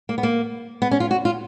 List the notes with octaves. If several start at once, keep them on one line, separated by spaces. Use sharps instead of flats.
A#3
B3
A#3
B3
C#4
F4
F#4
F4